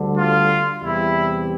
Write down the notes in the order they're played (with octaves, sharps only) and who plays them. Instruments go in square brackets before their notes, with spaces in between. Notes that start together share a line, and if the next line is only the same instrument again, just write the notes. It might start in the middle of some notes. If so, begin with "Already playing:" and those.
Already playing: [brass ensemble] D2 D3 G3
F4
E2 C3 G3 E4